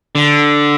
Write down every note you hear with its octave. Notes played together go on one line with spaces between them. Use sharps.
D3